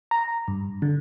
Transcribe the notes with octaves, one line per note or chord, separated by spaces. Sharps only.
A#5
G2
D3